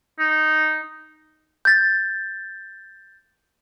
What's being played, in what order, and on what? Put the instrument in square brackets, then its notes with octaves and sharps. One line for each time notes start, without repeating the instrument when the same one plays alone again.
[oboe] D#4
[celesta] G6 A6